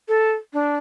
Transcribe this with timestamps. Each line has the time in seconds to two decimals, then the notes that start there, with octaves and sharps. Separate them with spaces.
0.08 A4
0.53 D4